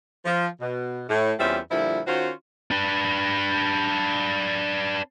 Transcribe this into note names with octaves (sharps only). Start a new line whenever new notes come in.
F3
B2
A2
E2 G3 C4 C#4 F4 E5
A#2 D3 F3 G3 E4
D#3 C#4 F4 F#4 C5
D4 B4